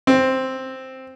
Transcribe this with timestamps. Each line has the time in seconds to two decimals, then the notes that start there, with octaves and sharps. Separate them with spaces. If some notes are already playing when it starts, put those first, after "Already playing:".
0.07 C4